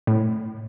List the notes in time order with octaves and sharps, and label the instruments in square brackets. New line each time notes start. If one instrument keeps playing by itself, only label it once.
[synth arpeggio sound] A2